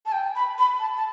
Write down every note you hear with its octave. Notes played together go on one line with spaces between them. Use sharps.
A5
G5
B5
B5
A5
A5